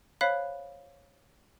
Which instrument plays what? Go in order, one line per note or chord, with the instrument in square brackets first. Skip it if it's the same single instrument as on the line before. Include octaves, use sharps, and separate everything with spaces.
[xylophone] C5 C#5 F5 B5 F#6 B6